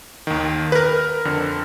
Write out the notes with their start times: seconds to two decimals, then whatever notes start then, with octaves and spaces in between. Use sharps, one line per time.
0.27 D#2 D#3
0.72 B4
0.75 A#4
1.25 F2 D3